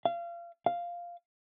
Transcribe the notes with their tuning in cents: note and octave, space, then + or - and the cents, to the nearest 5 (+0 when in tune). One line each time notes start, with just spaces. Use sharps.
F5 -30
F5 -5